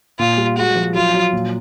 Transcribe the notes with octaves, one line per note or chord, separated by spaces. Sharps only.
A#2 F4
G3
G#3 F#4
F3
F#3 F4
F#3
A#2